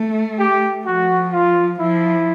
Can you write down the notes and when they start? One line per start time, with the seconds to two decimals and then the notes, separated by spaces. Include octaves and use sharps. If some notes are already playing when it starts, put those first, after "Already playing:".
Already playing: A3
0.38 G4
0.85 F3 F#4
1.33 F4
1.79 F3 E4